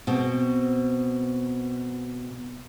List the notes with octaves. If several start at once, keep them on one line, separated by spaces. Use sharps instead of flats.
B2 C4